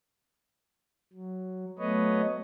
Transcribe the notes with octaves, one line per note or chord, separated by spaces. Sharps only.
F#3
F#3 A3 B3 B4 C#5 D#5